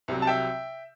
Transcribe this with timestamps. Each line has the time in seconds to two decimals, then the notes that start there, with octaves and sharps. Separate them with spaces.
0.08 C2 C3 F#3
0.22 A5
0.27 E5 G5